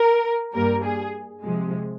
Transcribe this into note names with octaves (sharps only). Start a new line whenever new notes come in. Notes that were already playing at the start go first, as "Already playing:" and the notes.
Already playing: A#4
G2 G3 A#3 A#4
G#4
C3 F3 G#3